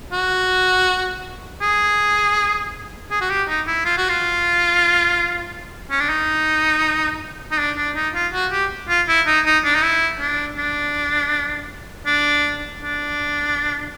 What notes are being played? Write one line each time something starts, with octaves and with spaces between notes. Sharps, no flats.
F#4
G#4
G#4
F#4
G4
D#4
E4
F4
F#4
F4
C#4
D4
D#4
D#4
D4
D4
D#4
F4
F#4
G4
F4
E4
D#4
D#4
D4
D#4
E4
D4
D4
D4
D4